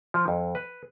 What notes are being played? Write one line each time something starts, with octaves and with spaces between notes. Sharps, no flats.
F3
F2
B4